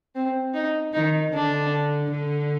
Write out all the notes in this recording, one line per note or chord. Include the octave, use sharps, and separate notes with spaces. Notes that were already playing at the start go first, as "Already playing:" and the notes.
C4
D#4
D#3 D#4
D3 D4
D3